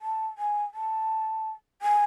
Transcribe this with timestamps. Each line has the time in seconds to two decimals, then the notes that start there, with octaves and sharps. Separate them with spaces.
0.02 A5
0.38 G#5
0.74 A5
1.82 G#5